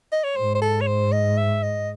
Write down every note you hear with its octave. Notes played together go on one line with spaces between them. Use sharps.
D#5
C#5
G#2 C5
C5
A4
C#5
C5
D#5
E5
D#5